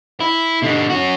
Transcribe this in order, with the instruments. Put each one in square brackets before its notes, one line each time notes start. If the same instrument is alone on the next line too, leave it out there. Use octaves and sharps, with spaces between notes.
[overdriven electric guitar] E4
B2 D3
C#4 F#4